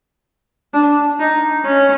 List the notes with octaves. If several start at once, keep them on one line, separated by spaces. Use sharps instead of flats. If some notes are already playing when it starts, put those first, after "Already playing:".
D4
D#4
C#4